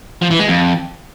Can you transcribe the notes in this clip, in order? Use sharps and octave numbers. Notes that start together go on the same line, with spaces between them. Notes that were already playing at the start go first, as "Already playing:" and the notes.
F3
E3
G#3
F2